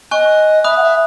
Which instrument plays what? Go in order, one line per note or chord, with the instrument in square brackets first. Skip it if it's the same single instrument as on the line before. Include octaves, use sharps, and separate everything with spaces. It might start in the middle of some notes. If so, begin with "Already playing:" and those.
[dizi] D#5 [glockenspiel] G#5 C#6 F#6
[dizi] E5 [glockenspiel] B5 D#6 F#6
[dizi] F#5
E5